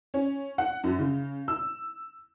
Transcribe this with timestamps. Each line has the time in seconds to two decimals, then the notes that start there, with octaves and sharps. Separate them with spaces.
0.14 C#4
0.58 F#5
0.84 F#2
0.99 C#3
1.48 E6